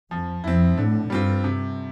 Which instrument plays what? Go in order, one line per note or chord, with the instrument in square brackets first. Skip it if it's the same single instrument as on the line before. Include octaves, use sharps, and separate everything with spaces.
[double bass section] F2 [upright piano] F3
[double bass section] F2 [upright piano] C4 E4
[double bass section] A2 [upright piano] D3
[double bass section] G2 [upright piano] G3 C4 F4
[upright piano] C3